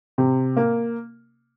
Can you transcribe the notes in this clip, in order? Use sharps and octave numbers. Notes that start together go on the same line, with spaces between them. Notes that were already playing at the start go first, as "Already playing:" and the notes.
C3
A#3